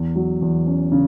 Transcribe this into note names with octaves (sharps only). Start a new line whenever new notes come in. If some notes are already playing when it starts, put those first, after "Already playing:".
Already playing: E2
F#3
E2
C#4
C#3